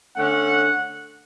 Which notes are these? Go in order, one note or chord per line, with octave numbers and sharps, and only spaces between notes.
D3 A3 C#4 F#5